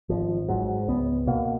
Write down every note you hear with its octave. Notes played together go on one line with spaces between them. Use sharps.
G#1 F3
G#2 F#3
C#2 B3
B2 A#3